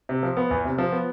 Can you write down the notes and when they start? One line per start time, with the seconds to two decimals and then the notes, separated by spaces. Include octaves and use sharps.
0.09 C3
0.23 F3
0.37 B3
0.51 E2
0.65 C3
0.78 F3
0.92 B3